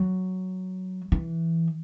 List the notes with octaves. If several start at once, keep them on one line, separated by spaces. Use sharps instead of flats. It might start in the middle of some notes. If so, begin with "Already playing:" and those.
Already playing: F#3
E3